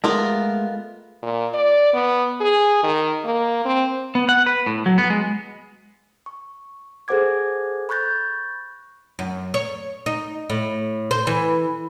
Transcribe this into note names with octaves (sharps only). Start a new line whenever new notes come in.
G#3 A3 B3 F4 A#4
A#2
D5
B3
G#4
D#3
A#3
C4
B3
F#5
B4
A2
F#3
B3
G#3
C#6
G#4 A4 C5 F#5 D6 G#6
B5 C#6 F#6 G6 A6 A#6
F#2
C#5
D#4
A2
C5
E3